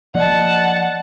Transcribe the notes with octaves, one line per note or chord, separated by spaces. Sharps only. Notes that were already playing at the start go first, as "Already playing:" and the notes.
F3 A#3 D5 D#5 F#5 A5